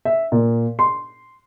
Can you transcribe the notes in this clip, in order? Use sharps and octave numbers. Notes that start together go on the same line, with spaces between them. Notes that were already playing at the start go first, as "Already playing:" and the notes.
E5
A#2
C6